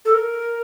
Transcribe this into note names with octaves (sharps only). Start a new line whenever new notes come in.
A4
A#4